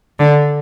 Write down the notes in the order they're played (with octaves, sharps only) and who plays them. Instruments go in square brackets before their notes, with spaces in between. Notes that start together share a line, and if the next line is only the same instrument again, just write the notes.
[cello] D3